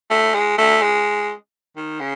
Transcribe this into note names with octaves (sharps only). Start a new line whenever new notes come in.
A3
G#3
A3
G#3
D#3
C#3